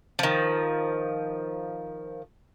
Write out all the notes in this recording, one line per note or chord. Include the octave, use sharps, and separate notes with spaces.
D#3 F3